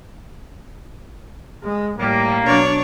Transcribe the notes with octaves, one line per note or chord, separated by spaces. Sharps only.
G#3
A2 G3 A#3
B2 F#3 D4 C#5 D5